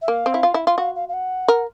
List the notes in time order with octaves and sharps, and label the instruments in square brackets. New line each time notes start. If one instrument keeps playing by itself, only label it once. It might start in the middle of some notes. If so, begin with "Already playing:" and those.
[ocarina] E5
[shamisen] A#3 [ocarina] F5
[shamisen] C4
E4
F4
E4
F4
[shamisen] F#4 [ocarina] F5
[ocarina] F5
F5
F#5
[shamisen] A#4